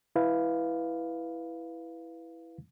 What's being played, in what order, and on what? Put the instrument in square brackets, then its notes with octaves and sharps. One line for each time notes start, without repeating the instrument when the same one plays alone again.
[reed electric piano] E4 B4 F5